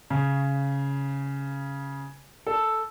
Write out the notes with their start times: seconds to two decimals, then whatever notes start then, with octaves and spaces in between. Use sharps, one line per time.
0.10 C#3
2.47 A4